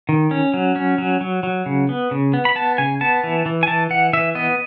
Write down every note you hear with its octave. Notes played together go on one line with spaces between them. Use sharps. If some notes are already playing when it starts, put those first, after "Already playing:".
D#3
C#4
F#3
C#4
F#3
F#3
F#3
C#3
B3
C#3
B3
B5
B3 A5
C#3 G#5
B3 A5
E3
E3
G#5
E3 A5
E3 F#5
E3 E5
B3 D#5